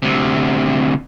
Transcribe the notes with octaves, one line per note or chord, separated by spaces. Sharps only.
D2 C3